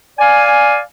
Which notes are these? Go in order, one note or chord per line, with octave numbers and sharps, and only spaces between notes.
D5 F5 G#5